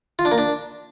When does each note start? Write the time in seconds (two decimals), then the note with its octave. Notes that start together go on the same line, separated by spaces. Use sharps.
0.19 F4
0.25 D4
0.32 A#3
0.38 D4